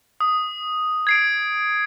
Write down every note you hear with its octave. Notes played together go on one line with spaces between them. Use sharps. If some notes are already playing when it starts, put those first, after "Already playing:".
D#6
G#6 C7 D7